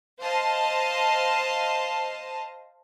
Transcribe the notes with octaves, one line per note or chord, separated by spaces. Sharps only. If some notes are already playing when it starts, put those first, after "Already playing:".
C5 D#5 F5 A5